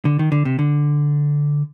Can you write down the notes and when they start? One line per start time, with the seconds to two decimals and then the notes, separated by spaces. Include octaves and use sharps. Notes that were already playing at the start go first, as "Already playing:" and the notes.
0.05 D3
0.19 D#3
0.32 D3
0.45 C3
0.59 D3